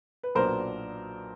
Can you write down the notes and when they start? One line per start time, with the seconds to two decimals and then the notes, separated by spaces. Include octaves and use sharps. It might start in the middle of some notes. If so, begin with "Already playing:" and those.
0.23 B4
0.35 B1 A#2 F#3 B3 D4 A#4 C5